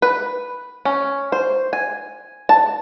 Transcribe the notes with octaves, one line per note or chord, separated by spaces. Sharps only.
B4
C#4
C5
G#5
A5